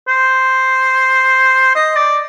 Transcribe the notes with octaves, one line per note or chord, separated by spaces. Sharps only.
C5
D#5
D5